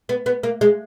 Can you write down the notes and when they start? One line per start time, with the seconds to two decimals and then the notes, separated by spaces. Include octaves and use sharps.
0.09 B3
0.26 B3
0.43 A#3
0.61 G#3